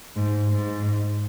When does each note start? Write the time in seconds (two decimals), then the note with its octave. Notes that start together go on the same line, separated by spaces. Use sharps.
0.16 G#2
0.48 G#2